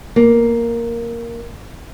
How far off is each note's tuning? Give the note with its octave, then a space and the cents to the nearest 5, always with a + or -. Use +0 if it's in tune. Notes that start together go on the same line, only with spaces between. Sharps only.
A#3 +0